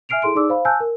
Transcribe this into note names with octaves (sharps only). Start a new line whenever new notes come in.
E5 G#5 F6 C7 D7 F7
E4 G#4 A4 C6 D7
D#4 G#4 D5 D6 E6
C5 F5 B5
G#5 A5 E6 F#6 G6
A#4